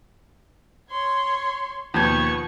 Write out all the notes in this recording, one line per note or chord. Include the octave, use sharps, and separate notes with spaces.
C#5 C6
D#2 B2 F3 B4 C#6 G6 G#6